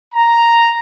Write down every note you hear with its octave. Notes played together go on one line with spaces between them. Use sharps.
A#5